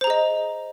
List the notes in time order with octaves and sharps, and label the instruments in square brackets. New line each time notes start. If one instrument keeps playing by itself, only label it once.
[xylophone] C5
A#5
G#4
D#5